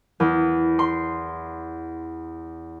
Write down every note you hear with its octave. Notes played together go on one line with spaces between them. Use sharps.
E2
C6